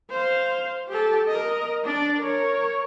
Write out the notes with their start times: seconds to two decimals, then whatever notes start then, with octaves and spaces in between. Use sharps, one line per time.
0.10 C5 F5
0.88 G4 A4
1.28 A#4 D#5
1.84 D4 D5
2.19 A#4 C#5